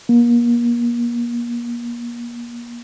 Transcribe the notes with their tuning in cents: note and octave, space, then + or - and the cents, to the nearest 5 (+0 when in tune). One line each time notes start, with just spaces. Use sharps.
A#3 +35